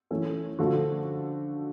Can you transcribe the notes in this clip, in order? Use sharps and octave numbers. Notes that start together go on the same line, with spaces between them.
E3 A3 C#4
D3 F3 A3 D4 F#4